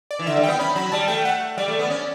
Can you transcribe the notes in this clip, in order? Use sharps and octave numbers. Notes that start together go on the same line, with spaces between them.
D5
E3
D3 E5
G3
G5
B3
C#4 B5
F#3 B5
G3 A5
A3 G5
F#5
G3 D5
A3
B3
C#4